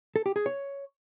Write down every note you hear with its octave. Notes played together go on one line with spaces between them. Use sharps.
A4
G4
G#4
C#5